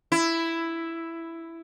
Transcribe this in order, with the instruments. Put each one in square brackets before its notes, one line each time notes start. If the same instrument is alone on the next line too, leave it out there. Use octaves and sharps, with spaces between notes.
[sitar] E4